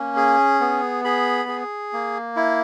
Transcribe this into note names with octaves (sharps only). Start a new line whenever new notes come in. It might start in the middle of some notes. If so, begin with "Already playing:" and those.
Already playing: A#3 C#4
G#4
B3
G#4 B5
G#4
A#3
E4